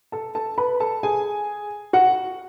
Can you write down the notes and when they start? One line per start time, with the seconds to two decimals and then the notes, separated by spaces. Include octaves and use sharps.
0.12 A4 A5
0.35 A4 A5
0.58 B4 B5
0.80 A4 A5
1.03 G#4 G#5
1.93 F#4 F#5